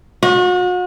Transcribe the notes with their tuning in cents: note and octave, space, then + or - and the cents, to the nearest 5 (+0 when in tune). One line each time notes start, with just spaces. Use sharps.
F#4 -40